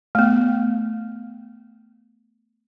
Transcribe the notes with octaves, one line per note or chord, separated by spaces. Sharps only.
A3 B3